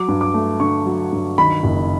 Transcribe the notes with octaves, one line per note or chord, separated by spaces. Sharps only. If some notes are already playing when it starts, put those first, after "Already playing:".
Already playing: F#3 D6
G2
D6
A3
D3 C#6
F#3
G2
D#3 B5
F#1